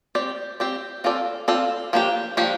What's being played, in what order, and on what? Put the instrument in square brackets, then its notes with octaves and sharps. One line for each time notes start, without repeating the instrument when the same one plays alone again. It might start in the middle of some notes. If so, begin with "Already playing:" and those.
[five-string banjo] C4 G4 D5
C4 G4 D5
C4 F4 A4 D5
C4 F4 A4 D5
F3 A#3 D4 G4
F3 A#3 D4 G4